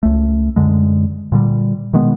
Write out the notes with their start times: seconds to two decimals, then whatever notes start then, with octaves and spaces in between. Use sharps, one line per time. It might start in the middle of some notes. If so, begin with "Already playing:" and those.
0.03 C#2 A3
0.56 F#2 D3 G#3
1.32 A#2 D3 G3
1.93 B2 D#3 G#3 B3